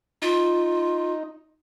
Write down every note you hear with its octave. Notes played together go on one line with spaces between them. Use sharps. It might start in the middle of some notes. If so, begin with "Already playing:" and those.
D#4 F4